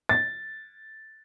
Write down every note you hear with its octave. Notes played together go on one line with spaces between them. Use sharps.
A6